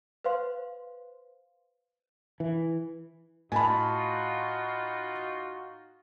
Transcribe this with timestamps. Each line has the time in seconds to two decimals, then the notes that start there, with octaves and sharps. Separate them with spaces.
0.24 B4 C5 F5 C6
2.40 E3
3.52 A2 D#4 F4 F#4 G#5 A5 B5